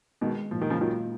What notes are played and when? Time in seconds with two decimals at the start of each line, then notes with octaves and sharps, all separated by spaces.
0.21 B2 D#3 G#3
0.51 A#2 F3
0.62 D#3
0.70 C#3 F3
0.81 D#3 F#3 F4